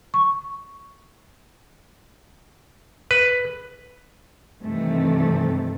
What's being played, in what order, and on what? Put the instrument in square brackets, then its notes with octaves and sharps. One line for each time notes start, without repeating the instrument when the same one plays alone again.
[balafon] C#6
[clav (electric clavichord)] B4
[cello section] G2 C3 D#3 E3 A3